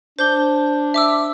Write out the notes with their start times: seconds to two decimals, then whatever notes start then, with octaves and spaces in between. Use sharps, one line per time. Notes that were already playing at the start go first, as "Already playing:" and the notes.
0.19 D4 C5 G6 G7
0.94 E5 D6 E6